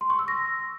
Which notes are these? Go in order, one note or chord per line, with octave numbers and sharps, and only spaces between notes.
C6
C#6
E6
A#6